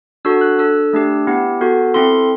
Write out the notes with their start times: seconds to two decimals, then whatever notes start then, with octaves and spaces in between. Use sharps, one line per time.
0.25 D4 F#4 A4 E6
0.41 F#6
0.58 D4 A4 E6
0.93 A3 D4 G4
1.27 B3 E4 G4
1.61 B3 F#4 A4
1.94 C4 E4 A4 C6